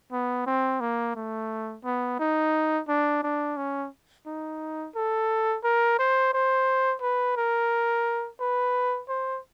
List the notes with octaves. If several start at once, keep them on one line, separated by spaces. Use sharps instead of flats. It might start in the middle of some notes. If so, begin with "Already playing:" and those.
B3
C4
A#3
A3
B3
D#4
D4
D4
C#4
D#4
A4
A#4
C5
C5
B4
A#4
B4
C5